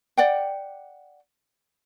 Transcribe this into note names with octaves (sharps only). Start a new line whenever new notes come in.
D5 F#5 G5